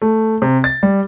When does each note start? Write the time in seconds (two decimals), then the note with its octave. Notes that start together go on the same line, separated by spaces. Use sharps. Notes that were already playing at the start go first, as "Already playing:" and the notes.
0.02 A3
0.42 C3
0.64 A6
0.83 G3